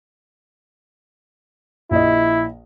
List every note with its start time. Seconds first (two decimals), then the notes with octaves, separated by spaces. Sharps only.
1.91 A#1 E4 D#5